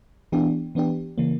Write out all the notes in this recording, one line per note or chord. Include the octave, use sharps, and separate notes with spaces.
E3 B3 D4 G4
E3 B3 D4 G4
C#3 E3 A#3